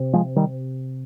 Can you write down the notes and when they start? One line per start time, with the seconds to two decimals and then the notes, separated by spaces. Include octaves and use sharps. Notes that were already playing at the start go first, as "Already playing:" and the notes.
Already playing: C3
0.13 F3 G#3
0.36 D#3 G3